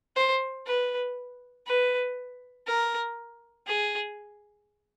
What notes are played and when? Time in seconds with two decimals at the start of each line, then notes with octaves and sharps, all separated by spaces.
0.16 C5
0.66 B4
1.66 B4
2.67 A#4
3.67 G#4